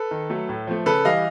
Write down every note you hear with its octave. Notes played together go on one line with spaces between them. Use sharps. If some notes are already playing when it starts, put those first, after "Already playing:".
Already playing: A4 B4
D#3
F#3 A3
A2
F3 A3
C#3 A4 B4
E3 G3 D#5 F5